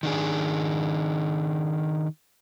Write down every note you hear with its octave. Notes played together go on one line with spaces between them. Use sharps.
D#3 D4 G#4